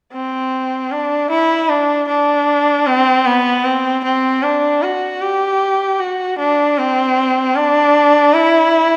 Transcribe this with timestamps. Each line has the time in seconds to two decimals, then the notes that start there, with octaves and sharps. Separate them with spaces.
0.13 C4
0.91 D4
1.30 E4
1.69 D4
2.08 D4
2.86 C4
3.25 B3
3.64 C4
4.04 C4
4.43 D4
4.82 F#4
5.21 G4
5.99 F#4
6.38 D4
6.78 C4
7.56 D4
8.34 E4